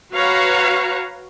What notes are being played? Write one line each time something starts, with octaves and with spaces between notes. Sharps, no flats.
F#4 B4 C#5 F5 A#5